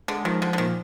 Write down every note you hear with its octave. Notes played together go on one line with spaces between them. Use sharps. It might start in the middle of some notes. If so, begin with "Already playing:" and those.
D3 G#3
D#3 F3
D3 F3
D3
A#2 D#3